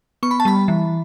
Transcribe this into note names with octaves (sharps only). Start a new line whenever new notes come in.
B3 C#6
B5
A5
G3 B5
E3